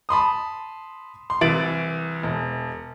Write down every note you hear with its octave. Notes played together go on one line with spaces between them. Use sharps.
A5 B5 C6 D#6
C6
C2 E3 A6 D7 F#7
E1